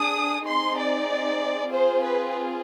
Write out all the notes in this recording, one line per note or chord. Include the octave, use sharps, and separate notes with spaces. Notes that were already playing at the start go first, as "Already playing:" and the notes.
Already playing: D4 G#4 D#6
C4 D#4 G#4 C6
D5
C4 F4 G#4 C5
B4